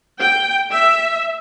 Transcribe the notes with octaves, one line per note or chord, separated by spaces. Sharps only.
G5
E5